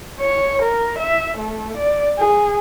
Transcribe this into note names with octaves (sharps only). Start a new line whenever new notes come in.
C#5
A#4
E5
A3
D5
G#4